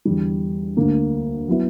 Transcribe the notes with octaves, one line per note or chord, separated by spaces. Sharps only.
E2 D3 G3
D2 D3 A#3
F#3 B3 E4